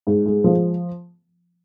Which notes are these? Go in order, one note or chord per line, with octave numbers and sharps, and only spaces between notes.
G#2
G#3
F3